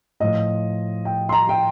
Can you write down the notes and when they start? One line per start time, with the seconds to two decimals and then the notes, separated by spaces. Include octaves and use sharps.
0.20 A2 F3 D#5
1.05 G5
1.29 C6
1.32 A#5
1.49 G5